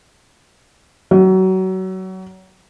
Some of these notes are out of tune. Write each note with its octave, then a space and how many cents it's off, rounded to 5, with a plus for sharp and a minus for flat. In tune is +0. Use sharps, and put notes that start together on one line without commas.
F#3 +25